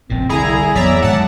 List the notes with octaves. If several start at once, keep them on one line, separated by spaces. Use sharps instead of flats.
F1 A#2 C4
C2 D3 E4 G#4 A#5
F2 E3 F#3 B3 D5 E5 A#5
G#2 D#3 F#5 A5